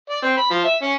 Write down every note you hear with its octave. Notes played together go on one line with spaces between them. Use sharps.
D5
C4
B5
F3
E5
C#4